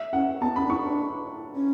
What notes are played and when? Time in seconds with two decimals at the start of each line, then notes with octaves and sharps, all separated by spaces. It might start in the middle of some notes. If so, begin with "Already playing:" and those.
Already playing: E5
0.13 C#4 F#5
0.41 B3 A5
0.56 C#4 B5
0.65 D4
0.70 E4 C#6
0.84 D4
1.55 C#4